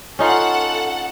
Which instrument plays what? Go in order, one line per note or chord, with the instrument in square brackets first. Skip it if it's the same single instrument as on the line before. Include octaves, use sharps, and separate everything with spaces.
[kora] C#4 D#4 F4 [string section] A4 F#5